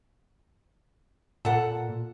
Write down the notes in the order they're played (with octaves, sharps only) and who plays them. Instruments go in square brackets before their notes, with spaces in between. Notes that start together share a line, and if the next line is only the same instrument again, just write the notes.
[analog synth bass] A#2 [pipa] A4 F#5